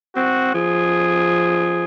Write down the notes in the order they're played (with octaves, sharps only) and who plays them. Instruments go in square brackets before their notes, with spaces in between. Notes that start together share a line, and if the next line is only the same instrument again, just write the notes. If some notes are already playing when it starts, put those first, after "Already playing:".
[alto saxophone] C4 [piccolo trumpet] F#4
[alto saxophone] F3 [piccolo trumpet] G#4